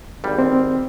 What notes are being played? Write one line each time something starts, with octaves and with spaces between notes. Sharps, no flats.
G#1 G3
C4